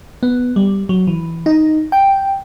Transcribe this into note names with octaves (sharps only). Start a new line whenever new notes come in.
B3
G3
F#3
E3
D#4
G5